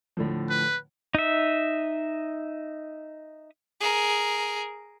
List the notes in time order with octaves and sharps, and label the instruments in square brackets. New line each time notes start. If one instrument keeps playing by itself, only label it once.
[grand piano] A2 D3 F3
[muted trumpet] B4
[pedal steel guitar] D#4 E5
[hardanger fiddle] G#4 A#4